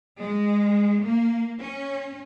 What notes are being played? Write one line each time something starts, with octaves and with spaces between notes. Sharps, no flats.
G#3
A#3
C#4